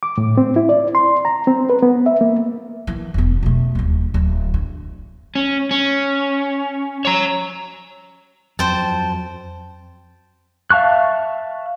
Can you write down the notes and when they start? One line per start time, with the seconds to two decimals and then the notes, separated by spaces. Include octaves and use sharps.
0.03 D6
0.18 A2
0.37 C4
0.56 E4
0.69 D5
0.95 C6
1.25 A#5
1.47 C4
1.70 B4
1.82 B3
2.06 E5
2.21 A#3
2.87 E3
3.14 E1 B3
3.43 B2 A3
3.75 D#1 D2
4.14 D1
4.54 D3
5.35 C#4
5.71 C#4
7.05 C#5 A#5
8.59 F2 F#3 C5 G5 A5
10.70 E5 F5 A5 C#6 F#6